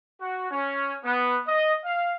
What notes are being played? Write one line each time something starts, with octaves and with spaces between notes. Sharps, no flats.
F#4
C#4
B3
D#5
F5